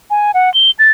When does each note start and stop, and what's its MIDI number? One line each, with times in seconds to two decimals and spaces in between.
0.10 0.31 80
0.34 0.52 78
0.54 0.71 103
0.79 0.92 93